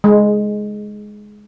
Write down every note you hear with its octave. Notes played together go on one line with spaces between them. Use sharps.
G#3